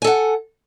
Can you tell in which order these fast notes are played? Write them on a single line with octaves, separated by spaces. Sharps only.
G#5 A4 F#5